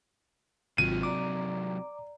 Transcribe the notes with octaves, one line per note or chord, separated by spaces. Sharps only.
G#1 C3 F#3 F4 D#7
D5 A#5 D6